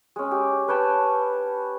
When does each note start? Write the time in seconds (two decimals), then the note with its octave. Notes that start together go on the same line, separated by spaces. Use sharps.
0.16 G#3 C#4
0.31 G4
0.68 B4 C#5 G5 A5